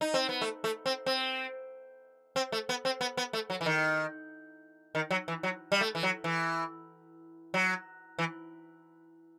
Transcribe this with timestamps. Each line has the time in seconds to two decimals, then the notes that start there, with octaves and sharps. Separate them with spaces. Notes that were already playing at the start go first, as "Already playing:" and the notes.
0.01 D#4
0.14 C4
0.29 B3
0.41 A3
0.64 A3
0.86 C4
1.06 C4
2.36 C4
2.52 A3
2.69 B3
2.85 C4
3.01 B3
3.17 B3
3.33 A3
3.50 F#3
3.61 E3
3.66 D#3
4.95 D#3
5.11 F#3
5.28 E3
5.43 F#3
5.72 G3
5.81 A3
5.95 E3
6.03 F#3
6.24 E3
7.54 F#3
8.19 E3